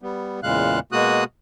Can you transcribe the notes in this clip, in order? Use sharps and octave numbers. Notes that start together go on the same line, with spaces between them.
G3 B3
E2 A#2 C#3 G#3 F5 F#6
B2 G#3 A#3 F#4 D#6 F#6